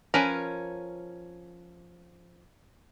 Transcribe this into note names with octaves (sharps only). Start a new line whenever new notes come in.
F3 C#4 A#4 B4 G#5